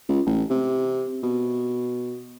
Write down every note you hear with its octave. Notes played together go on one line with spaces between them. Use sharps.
C#2
A1
C3
B2